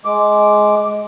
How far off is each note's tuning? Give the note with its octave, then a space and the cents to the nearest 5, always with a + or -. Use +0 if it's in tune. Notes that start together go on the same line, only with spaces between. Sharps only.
G#3 +10 D6 +0